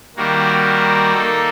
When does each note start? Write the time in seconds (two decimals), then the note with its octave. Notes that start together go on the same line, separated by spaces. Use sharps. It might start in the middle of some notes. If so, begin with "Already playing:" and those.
0.16 D#3 G3 A#3 F#4
1.13 A#3 D#4 A4